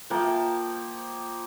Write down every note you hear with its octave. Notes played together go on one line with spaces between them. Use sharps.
F3 A#3 G5 A5